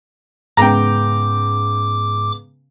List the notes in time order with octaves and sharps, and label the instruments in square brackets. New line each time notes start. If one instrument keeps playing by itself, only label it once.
[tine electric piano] G#2 [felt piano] C#3 G#3 B3 [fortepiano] G5 A#5 [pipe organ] D6